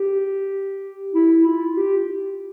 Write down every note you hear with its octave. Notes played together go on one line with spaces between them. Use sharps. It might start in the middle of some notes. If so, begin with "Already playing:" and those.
Already playing: G4
E4
F4
G4